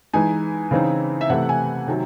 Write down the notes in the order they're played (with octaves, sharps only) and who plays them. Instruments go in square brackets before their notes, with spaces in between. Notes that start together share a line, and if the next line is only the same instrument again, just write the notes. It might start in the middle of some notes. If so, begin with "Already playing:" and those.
[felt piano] E3 G#3 D#4 G#5
C#3 E3 C4 D#4
E5
C3 E3 A3 C4 F#5
G#5
C3 D#3 F#3